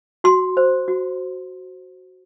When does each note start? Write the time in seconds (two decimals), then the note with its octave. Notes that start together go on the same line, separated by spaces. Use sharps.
0.24 F#4 C6
0.57 C5
0.88 F#4